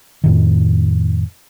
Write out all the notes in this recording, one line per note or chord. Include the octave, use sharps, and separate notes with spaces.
F2 A2 D#3